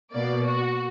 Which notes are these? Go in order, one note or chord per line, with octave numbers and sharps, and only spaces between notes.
B2 A#3 D5
F#4